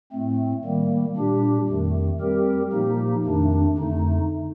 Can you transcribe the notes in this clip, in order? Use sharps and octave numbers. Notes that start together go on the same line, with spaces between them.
A2 A3 C4
D#3 G3 A#3
A#2 G3 D4 G4
F2 D#3 A3
G3 C4 G4 A#4
A#2 F3 A#3 D#4 G4
F2 D#3 A3 D4
F2 D3 A3 D#4